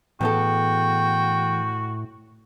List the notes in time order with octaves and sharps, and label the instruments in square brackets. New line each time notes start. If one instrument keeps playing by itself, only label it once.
[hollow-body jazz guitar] E2 B3 A4 [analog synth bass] A2 [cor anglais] F#4 [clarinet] G5